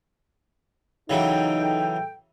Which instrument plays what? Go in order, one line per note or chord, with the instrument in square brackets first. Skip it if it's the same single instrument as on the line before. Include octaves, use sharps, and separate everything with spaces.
[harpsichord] C#3 E3 F#3 [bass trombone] D#4 [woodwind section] A4 G5